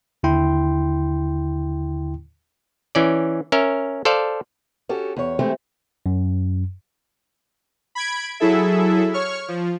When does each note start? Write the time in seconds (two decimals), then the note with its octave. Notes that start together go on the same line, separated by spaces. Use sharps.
0.23 D#2 D3 E4 G5 C6
2.95 E3 C#4 D5
3.52 C#4 A#4 E5
4.05 A4 C5 D5 F5
4.89 C#4 F#4 G4 A4
5.17 E2 C#5
5.39 E3 G#3 A3 C4 G4
6.06 F#2
7.95 B5 G#6 D7
8.40 F#3 E4 G#4 A4 E5
9.13 C#5 C#6 F6
9.48 F3